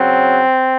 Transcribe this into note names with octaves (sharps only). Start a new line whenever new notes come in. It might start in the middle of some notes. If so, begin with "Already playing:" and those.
Already playing: C#3 F#3 C4